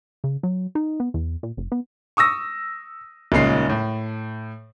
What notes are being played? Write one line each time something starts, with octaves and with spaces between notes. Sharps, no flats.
C#3
F#3
D#4
B3
E2
A#2
F#1
B3
C#6 D#6 E6 A#6
D#1 A#2 C#3 G#3 C7
A2